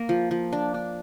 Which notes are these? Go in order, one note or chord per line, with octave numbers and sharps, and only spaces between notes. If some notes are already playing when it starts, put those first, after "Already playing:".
Already playing: A#3
F3
F3
D4
D4